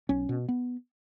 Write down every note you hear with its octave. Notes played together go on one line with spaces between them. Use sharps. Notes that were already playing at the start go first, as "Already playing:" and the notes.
B1 C#4
B2
B3